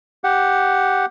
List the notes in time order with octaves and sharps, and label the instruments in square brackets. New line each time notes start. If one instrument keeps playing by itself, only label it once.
[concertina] G4 F#5